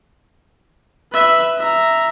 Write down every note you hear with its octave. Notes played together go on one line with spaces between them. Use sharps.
B4 E5
E5 A#5